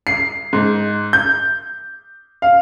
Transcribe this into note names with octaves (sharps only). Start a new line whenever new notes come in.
C7
G#2
G6
F5